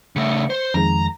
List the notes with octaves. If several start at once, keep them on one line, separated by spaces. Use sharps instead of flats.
C#3 A3 C#7
C5
F2 D#3 G#3 A#5